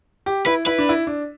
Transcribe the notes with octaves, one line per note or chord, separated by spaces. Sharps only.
G4
E4 B4
E4 B4
D4
E4
D4